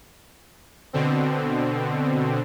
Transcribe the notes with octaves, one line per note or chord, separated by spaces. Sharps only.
B2 D3 C4